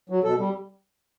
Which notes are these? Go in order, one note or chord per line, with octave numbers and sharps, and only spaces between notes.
F#3
B2 A4
G3